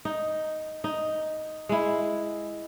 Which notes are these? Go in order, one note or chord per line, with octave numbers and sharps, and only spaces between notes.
D#4
D#4
G#3 E4